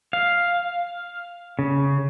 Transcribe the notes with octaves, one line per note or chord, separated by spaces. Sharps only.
F5
C#3